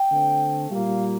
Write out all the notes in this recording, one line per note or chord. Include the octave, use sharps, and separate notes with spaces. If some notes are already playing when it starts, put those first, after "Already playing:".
Already playing: G5
D3 A3 C4
A#2 G3 A#3 F5